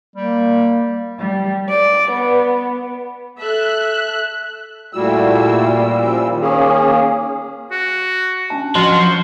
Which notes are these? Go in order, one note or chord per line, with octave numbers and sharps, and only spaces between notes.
G3 A#3
G3
D5
B3
A4 E5 F#6
A#2 G3 A3 E4 F#4 E6
F3 C#4 E5
D#3
A#3 C#4 G#4
F#4
C#4 D4 A5
F3 F#3 F4 C6
C5